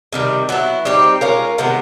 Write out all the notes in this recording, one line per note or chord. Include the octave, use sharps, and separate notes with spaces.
C3 D#3 G3
F#3 B3 E4
G3 C4 D#4 G4
G#3 C#4 F4 A#4
C3 D#3 G#3 B3